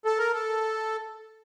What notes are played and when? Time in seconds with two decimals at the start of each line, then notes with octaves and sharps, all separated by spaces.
0.05 A4
0.18 A#4
0.33 A4